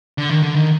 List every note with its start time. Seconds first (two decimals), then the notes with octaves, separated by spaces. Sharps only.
0.18 D3
0.29 D#3
0.42 D3
0.55 D#3